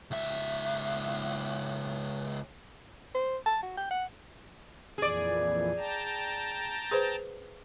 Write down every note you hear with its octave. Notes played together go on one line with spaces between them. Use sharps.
C#2 E5
C5
A5
F#4
G5
F#5
F2 A#2 E3 G#4 D5
G5 A5 A#5
G#4 B4 C5